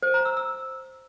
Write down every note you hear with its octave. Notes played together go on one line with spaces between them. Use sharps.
C5
A#5
E6
E6